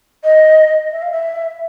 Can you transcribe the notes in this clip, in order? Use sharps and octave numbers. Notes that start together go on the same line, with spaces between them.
D#5
E5
F5
E5